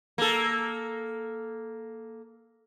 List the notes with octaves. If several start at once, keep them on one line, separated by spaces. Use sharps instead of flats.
A#3 A4